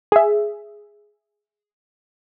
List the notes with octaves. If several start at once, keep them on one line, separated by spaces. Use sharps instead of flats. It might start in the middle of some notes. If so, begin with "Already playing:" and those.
G#4 E5